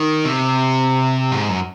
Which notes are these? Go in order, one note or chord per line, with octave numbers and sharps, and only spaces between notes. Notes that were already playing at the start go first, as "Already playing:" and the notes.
Already playing: D#3
C3
G#2
F#2